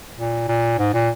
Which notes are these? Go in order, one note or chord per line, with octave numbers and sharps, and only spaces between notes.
A#2
A#2
G#2
A#2